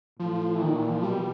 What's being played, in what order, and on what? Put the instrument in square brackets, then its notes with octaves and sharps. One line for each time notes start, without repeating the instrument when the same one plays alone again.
[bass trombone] A2 [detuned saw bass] F3
[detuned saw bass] E3
[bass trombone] A#2 [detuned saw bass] D#3
[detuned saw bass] E3
F3
[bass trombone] B2 [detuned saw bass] G3